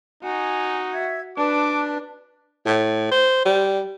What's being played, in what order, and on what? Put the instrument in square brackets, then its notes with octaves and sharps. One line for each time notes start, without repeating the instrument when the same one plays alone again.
[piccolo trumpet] D#4 [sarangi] F#4 [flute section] G#5
[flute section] E5 G#6
[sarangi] D4 [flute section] B4 A5 F#6 [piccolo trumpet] D6
[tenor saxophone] A2
C5
G3